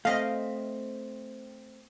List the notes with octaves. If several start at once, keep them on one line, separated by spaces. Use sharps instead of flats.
A3 C4 D#5 F5